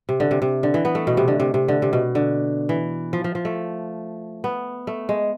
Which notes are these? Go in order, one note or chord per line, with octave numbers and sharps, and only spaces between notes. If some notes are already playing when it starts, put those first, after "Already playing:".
C3
D3
C3
C3
D3
E3
B3
A3
B2
C3
D3
C3
C3
D3
C3
B2
D3
E3
F3
F3
F3
A3
B3
A3
G#3